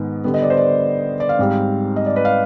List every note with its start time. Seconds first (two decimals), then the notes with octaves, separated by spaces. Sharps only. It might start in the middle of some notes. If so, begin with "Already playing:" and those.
Already playing: G#2 D#3 B3
0.24 D3 G3 B3
0.34 D#5
0.43 D5
0.50 C5
0.57 D5
1.20 D5
1.29 F5
1.39 G#2 G3 C4
1.96 D#5
2.06 D5
2.16 B4
2.25 F5